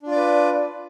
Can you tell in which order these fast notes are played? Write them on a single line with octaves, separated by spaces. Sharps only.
D4 F4 D5 B4